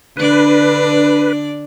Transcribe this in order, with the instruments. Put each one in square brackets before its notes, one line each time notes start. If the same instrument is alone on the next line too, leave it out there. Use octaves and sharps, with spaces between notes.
[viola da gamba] D3 D4 D5 [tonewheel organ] B4